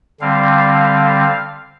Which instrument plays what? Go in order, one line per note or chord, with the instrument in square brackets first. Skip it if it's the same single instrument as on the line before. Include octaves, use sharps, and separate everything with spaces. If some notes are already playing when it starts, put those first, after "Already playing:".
[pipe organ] D3 G3 C4 F5